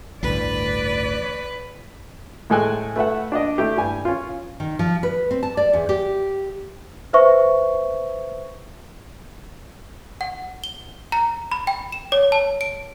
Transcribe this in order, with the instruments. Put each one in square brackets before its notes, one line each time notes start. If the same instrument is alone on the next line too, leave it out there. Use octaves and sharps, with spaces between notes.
[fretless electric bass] A1 D2 G2 [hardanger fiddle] B4 [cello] D5
[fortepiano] A2 G#3 A4 G5 G#5 F#6
A3 B4 E5 F#5
D4 D5 D#5
A3 E4 G4
G2 G#5
C#4 F4
[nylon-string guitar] D#3
F3
B4
C4
A5
D5
E2
G4
[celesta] B4 C5 E5 C#6
[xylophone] F#5
G7
A#5
B5
G5
E7
C#5
A5
D7